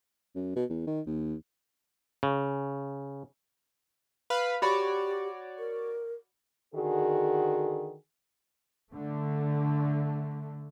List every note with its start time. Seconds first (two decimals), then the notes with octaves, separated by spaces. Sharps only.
0.35 F#2
0.56 B2
0.70 E2
0.87 D#3
1.06 D#2
2.23 C#3
4.30 B4 F5 B5
4.62 F#4 G4 C#5 D5 B5
5.59 A#4
6.75 D3 D#3 F#4 G#4
8.94 D3 A3